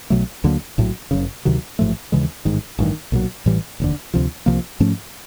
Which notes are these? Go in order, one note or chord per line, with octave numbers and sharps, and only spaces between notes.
B1 B2 F#3 A3
D2 D3 F#3 A#3
A#1 A2 F#3
F#1 F#2 C#3
D2 C3 D#3 F#3
A1 G#2 F3 A3
D#2 C#3 E3 G#3
A1 G#2 D#3
A1 G2 D#3
B1 A#2 F#3
A1 A2 E3 G3
F1 D#2 D3
D2 C3 F3
C2 C3 F3 A#3
G#2 F3 A3 C#4